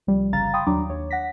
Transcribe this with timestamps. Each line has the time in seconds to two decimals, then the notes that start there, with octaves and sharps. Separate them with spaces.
0.07 C2 F3 G3
0.33 G1 C#3 G3 F5 A#5 A6
0.53 F5 G5 B5 C6 D#6
0.67 D#2 F#3 D4 A#5 D6
0.89 D#2 C#5
1.11 F#5 A#6 B6